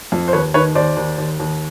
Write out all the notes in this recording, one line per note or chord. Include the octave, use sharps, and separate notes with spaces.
F2
C5
D#2 B4 C#5
D#3 B4 C#5
D#2 C5 D5
D#2
D#2
D#2